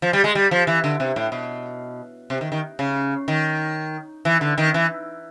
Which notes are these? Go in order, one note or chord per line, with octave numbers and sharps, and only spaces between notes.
F3
G3
G#3
G3
F3
E3
D3
C3
A2
B2
C3
D#3
D#3
C#3
D#3
E3
D3
D#3
E3